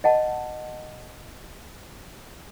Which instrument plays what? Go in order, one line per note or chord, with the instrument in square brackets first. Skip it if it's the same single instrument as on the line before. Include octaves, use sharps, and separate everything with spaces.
[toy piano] D#5 F#5 A5